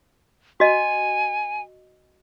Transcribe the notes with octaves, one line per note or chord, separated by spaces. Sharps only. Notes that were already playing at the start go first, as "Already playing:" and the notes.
F#4 D#5 G#5